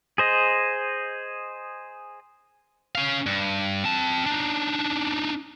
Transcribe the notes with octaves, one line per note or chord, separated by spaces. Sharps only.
G#4 C5 D#5
C#4 F5
G2
C4 A5
D4 D#4